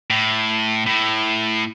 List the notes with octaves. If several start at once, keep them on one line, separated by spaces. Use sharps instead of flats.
A2
A2